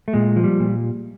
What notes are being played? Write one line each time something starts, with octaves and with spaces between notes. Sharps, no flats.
A3
A#2 G#3
F3
G3
A#2